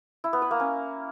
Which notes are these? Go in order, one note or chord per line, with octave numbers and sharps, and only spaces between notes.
E4
B3
B4
A#3
C#4